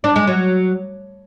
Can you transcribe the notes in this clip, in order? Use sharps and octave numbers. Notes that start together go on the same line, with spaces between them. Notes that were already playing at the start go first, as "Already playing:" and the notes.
D4
G#3
F#3